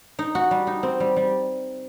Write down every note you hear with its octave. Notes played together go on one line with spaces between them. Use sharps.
D#4
F#4
G3
D#4
C4
G3
G3